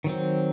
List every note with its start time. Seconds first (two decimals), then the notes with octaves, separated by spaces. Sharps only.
0.04 D#3 F#3 C4